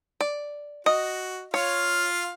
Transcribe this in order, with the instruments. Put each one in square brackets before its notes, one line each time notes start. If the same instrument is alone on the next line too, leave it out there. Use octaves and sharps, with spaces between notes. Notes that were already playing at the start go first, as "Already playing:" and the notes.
[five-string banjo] D5
[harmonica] F#4 [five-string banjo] D#5
[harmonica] F4 F5 [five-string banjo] C#5